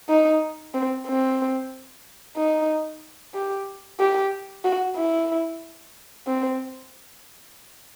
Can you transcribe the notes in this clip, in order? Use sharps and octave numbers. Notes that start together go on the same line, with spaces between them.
D#4
C4
C4
D#4
G4
G4
F#4
E4
C4